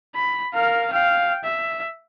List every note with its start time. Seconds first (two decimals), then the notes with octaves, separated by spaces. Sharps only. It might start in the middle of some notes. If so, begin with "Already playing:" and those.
0.15 B5
0.54 A#4 F5
0.92 F5 G5
1.44 E5